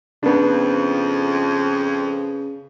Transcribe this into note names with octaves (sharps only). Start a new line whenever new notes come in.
F2 C#3 B3 D4